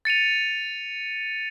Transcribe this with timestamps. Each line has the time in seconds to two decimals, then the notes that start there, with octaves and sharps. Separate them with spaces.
0.05 A6 C#7 D#7 F7